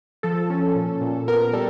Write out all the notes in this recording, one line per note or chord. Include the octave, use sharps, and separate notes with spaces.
F3 A4
C#4
A#2
A#2
B3 A#4
G3 A4